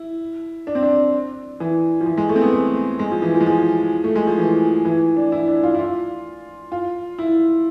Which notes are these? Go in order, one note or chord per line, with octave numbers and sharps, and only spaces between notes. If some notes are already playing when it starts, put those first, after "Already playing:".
Already playing: E4
D4
C4
D4
E3
F3
E3
G#3
A3
C4
B3
A3
G#3
F3
E3
F3
G#3
F3
A3
G#3
F3
E3
E3
D4
E4
D4
F4
E4
F4
F4
E4